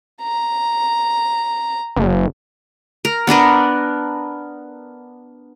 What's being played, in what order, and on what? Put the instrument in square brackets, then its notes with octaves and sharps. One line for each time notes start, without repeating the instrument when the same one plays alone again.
[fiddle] A#5
[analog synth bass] F#1
[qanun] A#4
B3 D4 A#4 B4